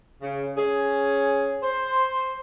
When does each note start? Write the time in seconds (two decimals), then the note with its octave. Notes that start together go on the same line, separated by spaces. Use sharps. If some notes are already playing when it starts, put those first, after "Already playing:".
0.22 C#3
0.56 C#4 G#4
1.62 C5